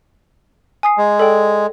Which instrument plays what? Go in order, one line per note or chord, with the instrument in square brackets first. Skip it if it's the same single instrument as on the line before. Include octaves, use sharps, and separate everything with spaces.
[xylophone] G#5 D#6 C7
[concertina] G#3
[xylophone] A4 D5 G5